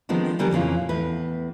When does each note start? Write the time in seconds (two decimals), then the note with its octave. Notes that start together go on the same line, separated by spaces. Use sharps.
0.09 D#3 F3 G#3 B3 C4 D4
0.39 D3 G3 B3 G#4 A#4
0.51 F2 A#2 C#3 E3 F4
0.89 E2 A2 B4